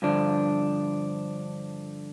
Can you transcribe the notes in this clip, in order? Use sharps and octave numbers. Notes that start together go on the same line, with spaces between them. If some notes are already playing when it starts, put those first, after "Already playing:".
G2 D3 F3 D4